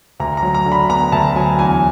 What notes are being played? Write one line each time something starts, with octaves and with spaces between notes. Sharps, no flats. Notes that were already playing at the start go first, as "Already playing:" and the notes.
D2 A#5
A#5
F#3
A#5
D3
B5
B3 A#5
D2 A5
F#3 G#5
E2 G#5